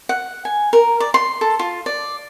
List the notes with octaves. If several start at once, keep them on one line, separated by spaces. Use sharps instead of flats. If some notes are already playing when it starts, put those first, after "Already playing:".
F#5
G#5
A#4
D5
C6
A4
F4
D5